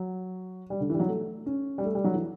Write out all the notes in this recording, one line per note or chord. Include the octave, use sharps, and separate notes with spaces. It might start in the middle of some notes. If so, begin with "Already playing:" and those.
Already playing: F#3
G3
D3
E3
G3
F#3
A3
C#4
G3
A3
G3
F#3
E3